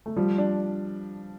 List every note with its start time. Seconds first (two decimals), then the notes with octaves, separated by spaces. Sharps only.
0.06 A3
0.16 F3 G3
0.38 D4